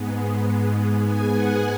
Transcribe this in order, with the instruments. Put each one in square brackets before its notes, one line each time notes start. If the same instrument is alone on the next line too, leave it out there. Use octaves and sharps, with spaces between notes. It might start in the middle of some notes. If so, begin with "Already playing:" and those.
Already playing: [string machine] G#2 G#3 B3
G#5
F#5